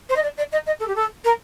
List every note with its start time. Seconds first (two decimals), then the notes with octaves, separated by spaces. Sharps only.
0.09 C5
0.16 D#5
0.22 D5
0.37 D5
0.52 D#5
0.66 D#5
0.80 A4
0.87 G4
0.95 A4
1.24 A#4